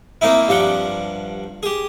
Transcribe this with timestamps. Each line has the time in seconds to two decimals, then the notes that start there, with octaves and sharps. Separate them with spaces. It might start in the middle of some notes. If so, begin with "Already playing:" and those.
0.21 A#3 C4 D#4 E4
0.48 G2 F3 G4 F#5
1.63 G4 G#4